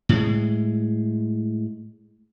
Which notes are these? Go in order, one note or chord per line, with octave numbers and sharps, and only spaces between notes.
A2 G#3